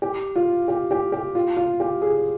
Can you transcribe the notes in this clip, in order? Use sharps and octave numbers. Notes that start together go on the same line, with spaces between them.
G4
F4
G4
G4
G4
F4
F4
G4
G#4